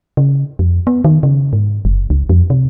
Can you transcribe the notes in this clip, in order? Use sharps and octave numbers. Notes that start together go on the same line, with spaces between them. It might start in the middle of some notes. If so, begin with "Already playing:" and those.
C#3
F2
B3
D#3
C#3
G#2
F#1
C#2
F2
C3